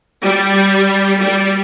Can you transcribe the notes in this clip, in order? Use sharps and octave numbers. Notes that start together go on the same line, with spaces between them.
G3
G3